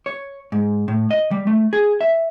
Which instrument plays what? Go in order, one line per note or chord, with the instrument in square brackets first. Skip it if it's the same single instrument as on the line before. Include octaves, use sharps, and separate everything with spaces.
[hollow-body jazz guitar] C#5
G#2
A2
D#5
G3
A3
G#4
E5